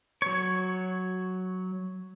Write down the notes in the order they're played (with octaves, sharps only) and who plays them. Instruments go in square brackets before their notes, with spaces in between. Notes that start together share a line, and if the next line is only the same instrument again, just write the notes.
[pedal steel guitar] F#3 C#5